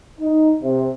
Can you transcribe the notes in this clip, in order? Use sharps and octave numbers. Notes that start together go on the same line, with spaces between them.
D#4
C3